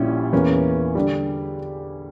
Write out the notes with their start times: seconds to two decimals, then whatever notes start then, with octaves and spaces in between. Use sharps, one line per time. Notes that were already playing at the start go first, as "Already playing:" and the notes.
Already playing: A#1 A#2 G3 C#4 E4
0.33 E2 E3 A#3 C#4
0.95 D3 G3